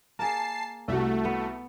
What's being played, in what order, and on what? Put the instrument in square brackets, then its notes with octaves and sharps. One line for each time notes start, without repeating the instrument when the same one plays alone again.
[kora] A#3 G#4 [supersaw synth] A5 C7
[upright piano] C2 F#4 [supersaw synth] A3
[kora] B3